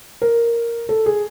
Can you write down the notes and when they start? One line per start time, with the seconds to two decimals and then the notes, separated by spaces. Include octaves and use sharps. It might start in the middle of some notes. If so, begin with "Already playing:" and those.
0.22 A#4
0.89 A4
1.06 G#4